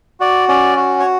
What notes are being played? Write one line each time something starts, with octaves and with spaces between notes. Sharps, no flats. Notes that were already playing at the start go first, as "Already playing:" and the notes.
F#4 D5
C#4 D5
F#4
C#5